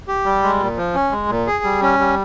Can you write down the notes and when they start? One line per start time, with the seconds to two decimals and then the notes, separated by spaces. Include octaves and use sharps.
0.08 G4
0.25 G3
0.43 G#3
0.59 A#2
0.77 F3
0.95 C#4
1.12 G#3
1.29 A#2
1.47 G#4
1.64 G3
1.82 C#4
1.99 G3